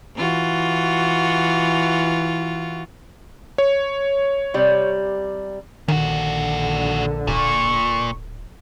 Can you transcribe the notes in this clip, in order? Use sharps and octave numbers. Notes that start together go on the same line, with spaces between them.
E3 F4 F#4
C#5
C3 G3 D5
A#1 A#2 D3 D#3 F#4
D1 A#2 C#6